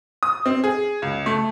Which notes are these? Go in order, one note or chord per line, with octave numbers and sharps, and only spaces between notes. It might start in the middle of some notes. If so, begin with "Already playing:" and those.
D#6
C4
G#4
C#2
A3